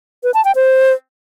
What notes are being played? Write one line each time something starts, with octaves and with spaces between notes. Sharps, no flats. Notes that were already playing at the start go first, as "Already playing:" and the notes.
B4
A5
G5
C5